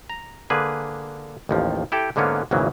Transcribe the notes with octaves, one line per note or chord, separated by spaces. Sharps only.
A#5
D3 A#3 G#4 B4
A1 D#2 F3
E4 G4 A4 G5
G#2 D3 A#3 B3 C#4
G#1 E2 A#2 C#3 E3 F#3